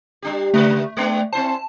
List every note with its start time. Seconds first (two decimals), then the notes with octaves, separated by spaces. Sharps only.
0.22 G3 D4 G4
0.54 C#3 A3 A#3 B4
0.97 G#3 B3 D4
1.33 C4 E4 C5 A5